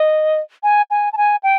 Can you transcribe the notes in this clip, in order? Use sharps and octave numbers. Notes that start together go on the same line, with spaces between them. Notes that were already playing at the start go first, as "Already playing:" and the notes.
Already playing: D#5
G#5
G#5
A5
G#5
G5